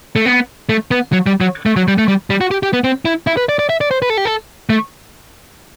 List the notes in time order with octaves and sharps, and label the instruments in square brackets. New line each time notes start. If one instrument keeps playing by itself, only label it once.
[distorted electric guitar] A3
B3
A3
B3
F#3
G3
F#3
A3
F#3
G3
A3
G3
G3
F#4
G4
G4
B3
C4
E4
E4
B4
D5
D5
E5
D5
C5
B4
A4
G4
A4
A3